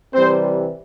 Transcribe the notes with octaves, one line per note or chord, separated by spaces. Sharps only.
C3 E3 G3 C4 C5